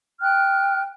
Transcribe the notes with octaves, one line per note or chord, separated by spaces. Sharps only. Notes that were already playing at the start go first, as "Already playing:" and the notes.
G5 F6 F#6